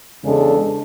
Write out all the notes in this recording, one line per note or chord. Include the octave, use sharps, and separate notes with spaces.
E2 C#3 G#3 D4 A4